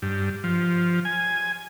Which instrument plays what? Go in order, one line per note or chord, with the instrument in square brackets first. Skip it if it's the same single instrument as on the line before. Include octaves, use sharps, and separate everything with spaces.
[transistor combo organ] G2
F3
G#5